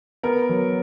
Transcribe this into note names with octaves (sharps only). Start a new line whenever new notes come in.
B3 A#4
F#3